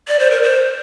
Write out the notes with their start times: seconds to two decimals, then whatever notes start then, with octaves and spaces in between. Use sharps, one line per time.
0.08 D5
0.19 C5
0.31 A#4
0.43 C5